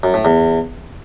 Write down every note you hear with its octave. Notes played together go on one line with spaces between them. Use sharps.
F#2
A2
E2